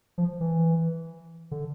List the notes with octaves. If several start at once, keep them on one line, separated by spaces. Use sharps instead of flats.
F3
E3
D3